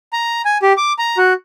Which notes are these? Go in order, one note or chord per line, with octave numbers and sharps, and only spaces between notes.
A#5
G#5
G4
D6
A#5
F#4